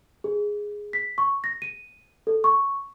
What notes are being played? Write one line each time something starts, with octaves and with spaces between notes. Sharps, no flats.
G#4
B6
C#6
A#6
D#7
A4
C#6